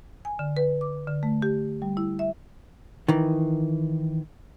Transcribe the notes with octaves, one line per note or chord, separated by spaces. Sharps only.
G#5
D3
B4
D6
D3
A3
G4
G3
E4
E5
D#3 E3